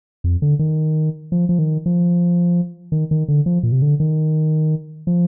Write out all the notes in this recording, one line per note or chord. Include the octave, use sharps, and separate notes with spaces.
F2
D3
D#3
F3
F3
D#3
F3
D#3
D#3
D3
F3
A#2
C3
D3
D#3
F3